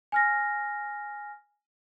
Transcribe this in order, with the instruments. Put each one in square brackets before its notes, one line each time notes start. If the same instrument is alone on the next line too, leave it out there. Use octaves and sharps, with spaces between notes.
[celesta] G#5 F6 A#6